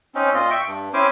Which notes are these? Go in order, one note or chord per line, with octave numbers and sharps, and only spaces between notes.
C4 C#4 D#4
A#2 F4 D#5
E5 G5 C#6
G2
C4 C#4 E4 C5 G#5 D6